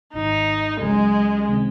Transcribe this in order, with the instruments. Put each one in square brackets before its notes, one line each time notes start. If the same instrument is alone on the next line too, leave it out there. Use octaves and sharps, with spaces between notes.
[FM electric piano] G#1 G#2 D#3 [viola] D#4
[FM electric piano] C#2 C#3 F#3 C#4 [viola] G#3
[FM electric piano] C3 D#3 G#3 C4